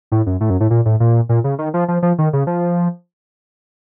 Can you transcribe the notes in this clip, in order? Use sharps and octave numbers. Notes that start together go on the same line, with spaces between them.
A2
F#2
A2
F#2
A2
A#2
A2
A#2
A#2
C#3
D#3
F3
F3
F3
D#3
C#3
F3